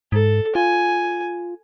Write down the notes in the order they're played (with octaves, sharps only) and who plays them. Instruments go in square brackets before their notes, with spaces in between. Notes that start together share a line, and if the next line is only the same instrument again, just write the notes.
[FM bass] G#2 [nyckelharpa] A4
[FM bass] F4 [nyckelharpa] G#5